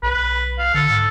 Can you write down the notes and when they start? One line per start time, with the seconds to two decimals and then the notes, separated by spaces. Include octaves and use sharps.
0.03 B1 B4
0.58 F5
0.74 D3 A4
0.90 G#2